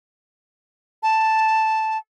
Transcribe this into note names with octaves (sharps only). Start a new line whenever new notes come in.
A5